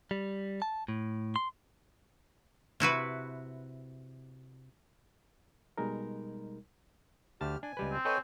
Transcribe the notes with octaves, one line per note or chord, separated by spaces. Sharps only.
G3
A5
A2
C6
C3 E4 F#4 B4
B2 G3 G#3 D#4 A#4
D2 G4 A5 F6
D4 G#5
C#2 G3 B4
C4
A4 B4 C#5 D#5 G5 G#5